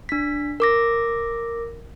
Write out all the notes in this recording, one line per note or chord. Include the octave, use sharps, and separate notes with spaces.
D4 B6
A#4 D6 A#6